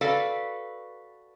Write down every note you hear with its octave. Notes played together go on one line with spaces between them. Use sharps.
F#4 A4 B4 D5 F5